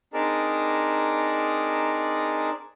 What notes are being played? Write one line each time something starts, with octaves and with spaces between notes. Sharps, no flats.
C4 D4 D#4 G#4 A#4 D5